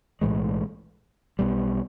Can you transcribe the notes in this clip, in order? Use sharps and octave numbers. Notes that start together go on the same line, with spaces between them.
B1 A2 E3 G#3
B1 B2 G3